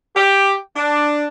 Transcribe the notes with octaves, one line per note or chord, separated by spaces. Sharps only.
G4
D4